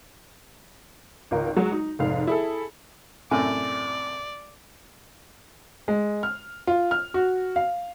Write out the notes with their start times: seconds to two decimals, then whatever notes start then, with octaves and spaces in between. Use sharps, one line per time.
1.31 G#1 C#2 F4 A#4
1.57 F#3 G#3 F#4
1.72 D#4
1.99 F1 G#2 F5
2.27 E4 G#4 A4
3.31 F#2 A2 C3 D5 G#5
5.88 G#3
6.23 F6
6.67 F4
6.91 F6
7.14 F#4
7.56 F5